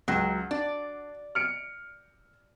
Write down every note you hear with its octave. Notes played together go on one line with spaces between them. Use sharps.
C#2 F#3
D4 D5
F6 C#7 D7